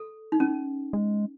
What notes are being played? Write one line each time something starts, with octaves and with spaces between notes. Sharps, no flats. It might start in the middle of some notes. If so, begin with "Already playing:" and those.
Already playing: A4
D#4
C#4
G#3